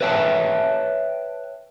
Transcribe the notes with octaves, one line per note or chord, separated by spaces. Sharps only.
B4 C#5 E5 G5 A5